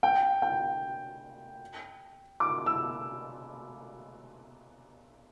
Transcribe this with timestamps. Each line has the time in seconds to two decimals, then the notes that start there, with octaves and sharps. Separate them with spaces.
0.03 G5
0.42 G5
2.40 D6
2.66 E6